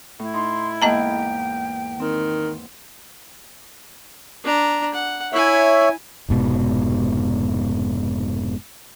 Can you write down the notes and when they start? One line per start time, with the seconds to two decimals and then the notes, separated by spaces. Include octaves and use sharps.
0.19 A2 E4
0.34 D#4 C6
0.82 E2 G#2 A#3 D#5 G5 A5 A#5
2.00 D#3 C4
4.44 D4 A#5
4.94 F#5
5.33 E4 C#5 E5 G#5
6.29 F1 G#2 B2